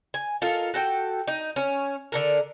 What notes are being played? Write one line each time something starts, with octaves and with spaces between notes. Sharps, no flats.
G#5
F4 A4 A#4 D#5
F#4 A4 G5
D#4
C#4 C#5
D3 A4 A#4